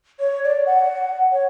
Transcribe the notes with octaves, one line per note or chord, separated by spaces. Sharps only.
C#5
D5
F#5
C#5